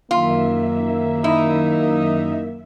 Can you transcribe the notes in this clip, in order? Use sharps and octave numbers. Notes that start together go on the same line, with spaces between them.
F#2 D#3 A#3 F4 E5
D#4 E4